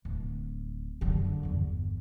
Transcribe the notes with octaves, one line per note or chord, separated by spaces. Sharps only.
D1
F#2 D3
G1 E2